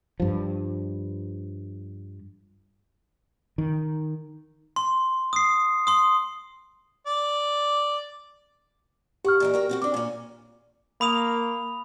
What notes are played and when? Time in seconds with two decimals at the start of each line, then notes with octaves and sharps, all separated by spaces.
0.20 G2 F3
3.58 D#3
4.76 C6
5.33 D#6 C7
5.87 C6 D#6
7.07 D5
9.25 G4 F#5 C#6 F6
9.40 A#2 E3 D#4
9.54 F#4 A#4 G5
9.69 C4 F4 F#4
9.82 C4 D4 D6
9.94 A#2 C#4
11.01 A#3 B5 D#6 F7